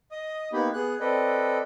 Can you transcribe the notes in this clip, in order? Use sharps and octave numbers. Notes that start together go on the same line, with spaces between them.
D#5 D#6
A#3 B3 D#4 G4 B5
B3 G#4 F#6
C4 A4 B4 D5 D#5